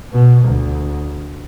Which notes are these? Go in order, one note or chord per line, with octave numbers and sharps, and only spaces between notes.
B2
D2